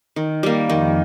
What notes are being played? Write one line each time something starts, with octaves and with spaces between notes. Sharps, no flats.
D#3
G3 A#3
F2 D#3 F3